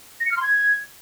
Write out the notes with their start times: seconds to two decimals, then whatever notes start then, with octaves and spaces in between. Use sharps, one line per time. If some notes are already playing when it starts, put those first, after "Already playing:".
0.20 A#6
0.26 C#7
0.31 F6
0.37 C6
0.42 G#6